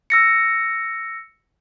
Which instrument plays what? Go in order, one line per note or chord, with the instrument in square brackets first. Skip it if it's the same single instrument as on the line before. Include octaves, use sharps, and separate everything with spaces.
[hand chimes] E6 A#6 C#7